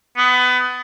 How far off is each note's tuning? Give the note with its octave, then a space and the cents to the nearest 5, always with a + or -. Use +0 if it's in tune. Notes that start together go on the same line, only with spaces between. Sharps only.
B3 +25